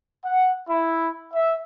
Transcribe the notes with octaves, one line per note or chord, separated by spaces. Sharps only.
F#5
E4
E5